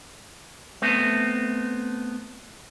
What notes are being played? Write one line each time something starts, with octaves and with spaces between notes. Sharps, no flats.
A3 B3 C4